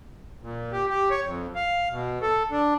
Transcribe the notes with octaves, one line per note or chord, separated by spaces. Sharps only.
A#2
G4
G4
C#5
F2
F5
B2
A4
D4